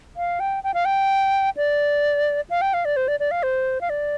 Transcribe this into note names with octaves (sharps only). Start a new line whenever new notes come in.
F5
G5
G5
F5
G5
D5
F5
G5
F5
D5
C5
D5
D5
F5
C5
F5
D5